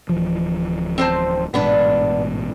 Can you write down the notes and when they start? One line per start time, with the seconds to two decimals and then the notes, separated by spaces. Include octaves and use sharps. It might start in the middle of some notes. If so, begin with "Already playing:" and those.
0.09 D1 E3 F3
0.98 C4 C5 A5
1.54 A1 G#2 B2 B3 D4 B4